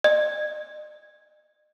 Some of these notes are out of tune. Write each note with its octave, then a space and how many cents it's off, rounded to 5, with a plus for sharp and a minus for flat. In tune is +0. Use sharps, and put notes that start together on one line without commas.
D#5 -45